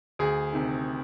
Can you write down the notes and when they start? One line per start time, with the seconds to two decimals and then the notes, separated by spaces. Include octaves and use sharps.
0.19 D2 G#4
0.53 C3 D#3